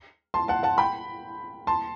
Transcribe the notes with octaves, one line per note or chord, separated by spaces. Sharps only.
A5 C6
F#5 A5
F#5 A5
G5 B5
A5 C6